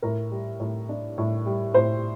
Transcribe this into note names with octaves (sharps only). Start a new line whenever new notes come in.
A2 A#4
G3
A2
D4
A2
G3
A2 C5